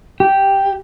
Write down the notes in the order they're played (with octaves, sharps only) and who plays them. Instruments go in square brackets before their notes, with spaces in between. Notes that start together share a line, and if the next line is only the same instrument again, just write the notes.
[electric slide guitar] G4